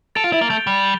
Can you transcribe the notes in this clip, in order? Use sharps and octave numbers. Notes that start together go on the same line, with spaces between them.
A4 A6 D7 F7
F4
E4
A#3
A3 G6 D7 G7
G3
G7